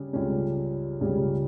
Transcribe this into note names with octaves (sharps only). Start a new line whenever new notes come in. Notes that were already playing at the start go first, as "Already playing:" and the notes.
Already playing: C#3 G3 C#4 G4
C#2 C#3 G3 C#4 G4
C#2 C#3 G3 C#4 G4